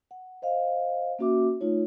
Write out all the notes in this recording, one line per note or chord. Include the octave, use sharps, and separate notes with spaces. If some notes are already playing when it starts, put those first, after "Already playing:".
F#5
C5 D#5 F5
A#3 C#4 F#4 E5 D6
A3 D#4 F4 C#5